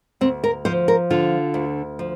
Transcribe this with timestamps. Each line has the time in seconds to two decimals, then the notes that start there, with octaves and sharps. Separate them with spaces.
0.21 D2 C4
0.44 A#4
0.65 F3 C5
0.88 A#4
1.10 D3 F4
1.54 D2
1.99 F3